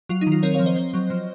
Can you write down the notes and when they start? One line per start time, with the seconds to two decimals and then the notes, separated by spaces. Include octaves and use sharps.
0.09 F#3 F4
0.21 D#4
0.27 D#3
0.32 F4
0.43 C4 A#4 C#5
0.54 C#5 F5
0.59 F3
0.66 C5 D#5
0.76 C4
0.94 F#3
1.10 F3